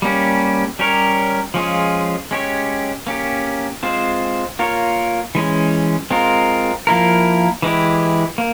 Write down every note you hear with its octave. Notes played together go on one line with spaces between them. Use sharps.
G3 A#3 C#4 G4
G3 C#4 G4 A#4 C#5
F3 G#3 C#4 F4 G#4
G#3 C#4 G4 C#5
A#3 C#4 G4
G#3 C4 F4 C5
A#3 F4 A#4 C#5
E3 G#3 C#4
G#3 C4 F4 A#4
F3 A#3 E4 A#4
E3 G#3 E4 G4
A#3